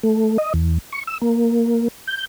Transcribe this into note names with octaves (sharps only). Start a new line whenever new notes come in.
A3
D#5
E2
C#6
E6
A#3
G6